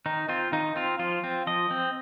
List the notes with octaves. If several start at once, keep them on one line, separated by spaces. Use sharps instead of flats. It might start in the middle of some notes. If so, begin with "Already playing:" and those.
D#3 D#4
C4 F4
D#3 D#4
C4 F4
F3 F4
C4
F3 D#5
C4